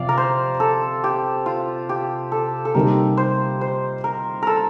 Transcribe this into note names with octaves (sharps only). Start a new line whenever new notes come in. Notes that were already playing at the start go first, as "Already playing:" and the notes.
Already playing: C3 F3 D5 F5
A#4
C5
A4
G4
F4
G4
A4
A4
C3 G3 A#3 D#4 A#4
C5
C5
A#4
A4 A#4